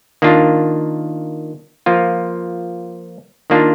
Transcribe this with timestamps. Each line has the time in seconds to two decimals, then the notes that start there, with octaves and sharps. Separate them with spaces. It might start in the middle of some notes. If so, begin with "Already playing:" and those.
0.22 D#3 A#3 D4 F4
1.86 F3 A#3 F4
3.50 D#3 A#3 D4 F4